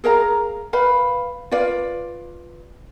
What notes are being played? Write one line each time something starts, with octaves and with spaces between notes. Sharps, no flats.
G#4 A#4 F5 A#5
B4 F5 B5
F4 B4 D5 F5